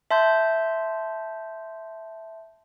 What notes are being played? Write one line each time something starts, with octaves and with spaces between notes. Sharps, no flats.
E5 A5 C6 G6